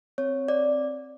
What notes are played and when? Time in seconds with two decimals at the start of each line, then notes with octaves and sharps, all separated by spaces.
0.18 C4 C#5
0.48 C4 D5